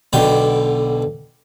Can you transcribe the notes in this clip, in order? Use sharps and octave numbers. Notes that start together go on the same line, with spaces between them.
B1 B2 D3 G5